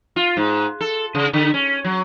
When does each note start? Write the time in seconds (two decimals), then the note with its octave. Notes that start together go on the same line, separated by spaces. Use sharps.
0.16 F4
0.37 G#2
0.81 A4
1.15 C#3
1.33 D3
1.54 C#4
1.84 F#3